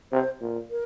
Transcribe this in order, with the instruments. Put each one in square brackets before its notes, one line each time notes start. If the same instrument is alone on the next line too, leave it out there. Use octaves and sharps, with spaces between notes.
[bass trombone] C3 [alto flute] C5
[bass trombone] A#2
[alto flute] A#4